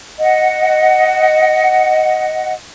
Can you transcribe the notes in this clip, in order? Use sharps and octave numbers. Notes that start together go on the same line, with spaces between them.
D#5 F#5